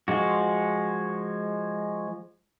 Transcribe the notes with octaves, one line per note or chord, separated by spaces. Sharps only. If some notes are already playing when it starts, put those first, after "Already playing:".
F3 G#3 F#4